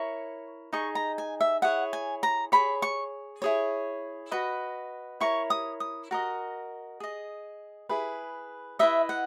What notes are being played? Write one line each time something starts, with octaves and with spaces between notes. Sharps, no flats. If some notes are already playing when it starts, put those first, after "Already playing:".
Already playing: E4 A#4 C#5 C#6
D#4 G#4 D#5 C#6
A#5
G#5
E5
E4 G#4 C#5 F#5
G#5
A#5
G#4 C#5 B5
C#6
E4 G#4 C#5
F#4 B4 D#5
E4 A#4 C#5 C#6
D#6
D#6
F#4 A#4 D#5
G#4 D#5
E4 G#4 B4
E4 B4 D#5 E5
F#5